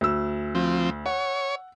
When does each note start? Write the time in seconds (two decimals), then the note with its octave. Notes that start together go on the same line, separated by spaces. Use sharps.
0.01 D2 E6
0.55 F3 C4
1.06 C#5 F#5